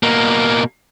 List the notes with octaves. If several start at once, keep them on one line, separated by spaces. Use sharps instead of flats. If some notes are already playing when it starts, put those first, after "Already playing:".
B2 A#3